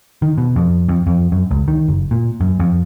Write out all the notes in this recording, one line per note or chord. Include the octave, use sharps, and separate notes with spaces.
D#3
B2
F2
F2
F2
F#2
C#2
D#3
F#1
A#2
F#2
F2